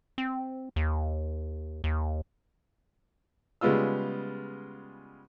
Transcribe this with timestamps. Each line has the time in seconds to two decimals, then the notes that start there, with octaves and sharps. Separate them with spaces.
0.18 C4
0.76 D#2
1.84 D#2
3.61 C#3 G3 G#3 B3 F4 E6